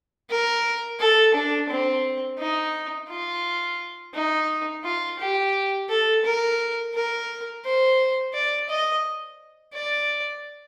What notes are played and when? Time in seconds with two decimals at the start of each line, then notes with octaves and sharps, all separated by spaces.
0.30 A#4
1.00 A4
1.34 D4
1.70 C4
2.39 D#4
3.09 F4
4.14 D#4
4.84 F4
5.19 G4
5.89 A4
6.25 A#4
6.94 A#4
7.65 C5
8.34 D5
8.69 D#5
9.74 D5